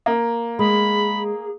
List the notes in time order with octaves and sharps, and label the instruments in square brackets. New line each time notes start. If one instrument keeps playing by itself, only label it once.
[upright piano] A#3
[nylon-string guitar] G#3 [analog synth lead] G#4 [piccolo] B5